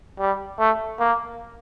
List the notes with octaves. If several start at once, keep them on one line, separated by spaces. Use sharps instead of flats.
G3
A3
A#3